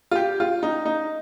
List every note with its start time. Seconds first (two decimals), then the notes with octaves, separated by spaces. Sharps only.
0.11 F4
0.15 G4
0.40 F4
0.63 D#4
0.85 D#4